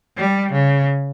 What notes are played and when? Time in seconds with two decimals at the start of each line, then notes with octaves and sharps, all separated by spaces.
0.17 G3
0.52 C#3